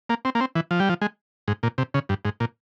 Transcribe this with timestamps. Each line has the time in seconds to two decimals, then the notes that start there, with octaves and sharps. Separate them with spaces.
0.09 A#3
0.25 C4
0.35 A#3
0.40 C4
0.55 E3
0.71 F3
0.80 G3
0.89 F3
1.02 G#3
1.48 G#2
1.63 A#2
1.78 C3
1.94 C#3
2.09 G2
2.25 G#2
2.40 A#2